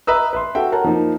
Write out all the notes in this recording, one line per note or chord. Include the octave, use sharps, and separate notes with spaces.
B4 D#5 E5 A#5 D#6 E6
B4 E5 C6
F#4 A4 E5 G5
A#4 C#5 F#5 A5 A#5
F3 A#3 D#4